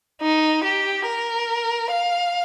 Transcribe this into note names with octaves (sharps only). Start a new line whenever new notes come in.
D#4
G4
A#4
F5